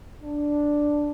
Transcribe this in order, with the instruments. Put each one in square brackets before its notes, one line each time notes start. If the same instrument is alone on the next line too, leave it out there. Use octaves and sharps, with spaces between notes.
[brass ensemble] D4